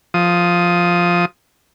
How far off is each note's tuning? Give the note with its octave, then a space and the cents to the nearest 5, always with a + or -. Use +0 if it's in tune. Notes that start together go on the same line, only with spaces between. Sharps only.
F3 +0 D#6 +5